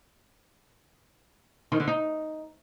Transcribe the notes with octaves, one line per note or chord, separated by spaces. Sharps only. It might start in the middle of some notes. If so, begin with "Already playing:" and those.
D#3
D3
D#4